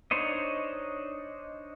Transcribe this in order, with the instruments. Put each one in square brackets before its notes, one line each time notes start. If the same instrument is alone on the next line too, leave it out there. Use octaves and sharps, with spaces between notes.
[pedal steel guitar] D4 D#4 C5 C#5 D#5